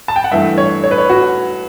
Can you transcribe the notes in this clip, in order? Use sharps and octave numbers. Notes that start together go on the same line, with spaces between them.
A5
G5
F#5
G2 E3 A3 E5
C#5
C#5
B4
C#5
F#4